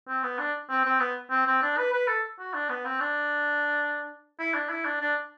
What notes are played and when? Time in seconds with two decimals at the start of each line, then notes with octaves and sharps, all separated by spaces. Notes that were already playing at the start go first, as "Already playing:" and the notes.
0.08 C4
0.24 B3
0.39 D4
0.70 C4
0.85 C4
1.00 B3
1.31 C4
1.47 C4
1.62 D4
1.78 B4
1.93 B4
2.08 A4
2.39 F#4
2.54 D4
2.69 B3
2.85 C4
3.00 D4
4.39 E4
4.54 D4
4.69 E4
4.85 D4
5.01 D4